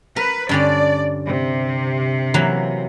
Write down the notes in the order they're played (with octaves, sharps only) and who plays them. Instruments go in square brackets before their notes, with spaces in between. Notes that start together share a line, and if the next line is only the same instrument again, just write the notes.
[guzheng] A#4 [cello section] B4
[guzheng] G2 D3 C#4 [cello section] D5
[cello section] C3
[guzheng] E3 F#3 A#3